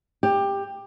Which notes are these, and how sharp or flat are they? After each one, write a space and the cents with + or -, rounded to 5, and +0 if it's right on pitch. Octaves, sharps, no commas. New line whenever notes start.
G4 +15